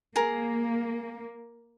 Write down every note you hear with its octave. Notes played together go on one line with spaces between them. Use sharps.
A#3 G#4 A#4